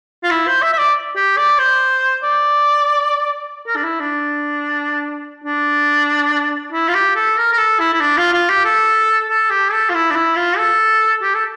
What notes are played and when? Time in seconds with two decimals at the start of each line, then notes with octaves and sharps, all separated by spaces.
0.23 F4
0.31 E4
0.47 C5
0.62 E5
0.73 E5
0.78 D5
1.16 G4
1.37 D5
1.58 C5
2.23 D5
3.67 A#4
3.76 D4
3.84 E4
4.00 D4
5.44 D4
6.72 E4
6.88 F4
6.94 G4
7.15 A4
7.37 A#4
7.53 A#4
7.58 A4
7.80 E4
7.93 E4
8.00 D4
8.17 F4
8.33 F4
8.49 G4
8.65 A4
9.29 A4
9.50 G4
9.72 A4
9.89 F4
9.94 E4
10.11 D4
10.15 E4
10.36 F4
10.57 A4
11.22 G4
11.35 A4